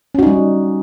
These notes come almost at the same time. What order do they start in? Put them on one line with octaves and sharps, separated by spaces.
C#4 F#4 D#4 G3